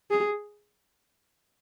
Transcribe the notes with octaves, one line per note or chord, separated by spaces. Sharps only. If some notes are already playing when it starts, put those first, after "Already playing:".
G#4